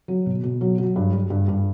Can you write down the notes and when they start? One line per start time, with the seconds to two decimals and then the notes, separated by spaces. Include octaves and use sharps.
0.08 F#3
0.26 B2
0.43 B2
0.61 F#3
0.78 F#3
0.96 G2
1.13 G2
1.30 G2
1.48 G2